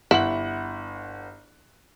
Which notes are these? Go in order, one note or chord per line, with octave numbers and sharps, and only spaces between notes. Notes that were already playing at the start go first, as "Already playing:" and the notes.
G1 E4 F#5 F#7